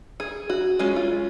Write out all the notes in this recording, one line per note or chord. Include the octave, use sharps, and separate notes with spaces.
G#4
F#4
G#3 C#4 F4
F4